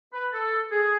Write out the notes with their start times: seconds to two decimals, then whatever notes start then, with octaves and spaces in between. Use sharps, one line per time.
0.13 B4
0.33 A4
0.71 G#4